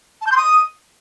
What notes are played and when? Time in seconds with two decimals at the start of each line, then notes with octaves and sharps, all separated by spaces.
0.21 A5
0.26 G6
0.32 C6
0.37 D#6